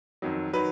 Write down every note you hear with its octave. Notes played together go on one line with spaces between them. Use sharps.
F2 D#3 F#3
D#3 F#3 B4